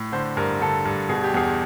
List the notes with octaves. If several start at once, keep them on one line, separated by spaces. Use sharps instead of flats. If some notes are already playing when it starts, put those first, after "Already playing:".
Already playing: A2
D3 C5
G2 A#4
D3 A4
G2
B2 G#4
G4
E2 G#4